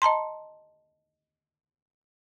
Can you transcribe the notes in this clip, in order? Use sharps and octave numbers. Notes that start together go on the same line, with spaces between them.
D#5 A5 A#5 C6